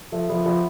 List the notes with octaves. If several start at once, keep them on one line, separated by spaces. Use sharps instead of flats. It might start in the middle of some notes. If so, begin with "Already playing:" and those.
F3 A3
F3 B3
F3 B3